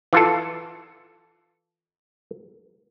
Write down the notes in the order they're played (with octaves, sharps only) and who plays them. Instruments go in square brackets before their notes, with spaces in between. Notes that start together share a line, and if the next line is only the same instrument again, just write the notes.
[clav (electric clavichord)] E3 F4 A4